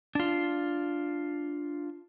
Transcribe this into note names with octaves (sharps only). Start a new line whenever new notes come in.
D4 F4